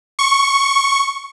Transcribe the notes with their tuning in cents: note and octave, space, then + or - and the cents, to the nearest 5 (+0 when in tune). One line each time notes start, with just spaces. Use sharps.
C#6 -5